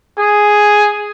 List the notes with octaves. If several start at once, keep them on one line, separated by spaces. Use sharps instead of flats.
G#4